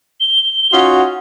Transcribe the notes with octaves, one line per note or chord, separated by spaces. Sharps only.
G7
C#4 D#4 F4 F#4